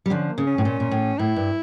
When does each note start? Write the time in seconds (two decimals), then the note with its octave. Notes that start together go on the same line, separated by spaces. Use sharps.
0.06 G3
0.10 D3 F3 C#4
0.29 A#3
0.38 C#3
0.47 C#4
0.58 A2
0.65 A#2
0.80 A#2
0.91 A2
1.18 A2 E4
1.36 G2